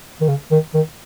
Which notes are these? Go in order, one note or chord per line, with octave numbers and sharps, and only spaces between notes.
D#3
C#3
D#3
D#3